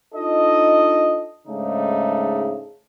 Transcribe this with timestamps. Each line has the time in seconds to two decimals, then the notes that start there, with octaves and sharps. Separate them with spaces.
0.15 D4 D#4 F4 A4 D#5
1.48 G#2 C#3 G#3 A3 D4 D#4